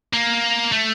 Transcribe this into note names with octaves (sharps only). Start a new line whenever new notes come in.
A#3
A3